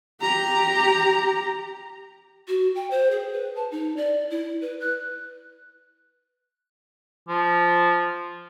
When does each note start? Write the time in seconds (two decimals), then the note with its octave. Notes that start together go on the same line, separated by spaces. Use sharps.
0.21 G4 A#5
2.48 F#4
2.75 G5
2.91 C5
3.11 G#4
3.33 B4
3.56 A5
3.71 D#4
3.97 D5
4.30 E4
4.61 B4
4.80 F#6
7.29 F3